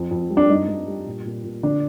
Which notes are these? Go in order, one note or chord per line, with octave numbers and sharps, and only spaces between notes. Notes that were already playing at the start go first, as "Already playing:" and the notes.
Already playing: F2
F2
G3
D4
G2 D#4
G2
G3
A#2
A#2
A#2
D3 D4